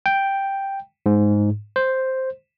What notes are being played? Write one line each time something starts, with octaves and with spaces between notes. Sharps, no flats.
G5
G#2
C5